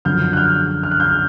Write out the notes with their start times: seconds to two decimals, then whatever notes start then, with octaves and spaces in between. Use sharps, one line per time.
0.05 F#2 D3 F3 F6 G6
0.33 F#6
0.37 F6 G6
0.83 F6
0.91 F#6
1.00 F6 G6